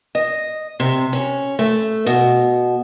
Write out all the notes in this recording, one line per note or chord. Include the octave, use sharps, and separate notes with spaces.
D#5
C3
C#4
A3
B2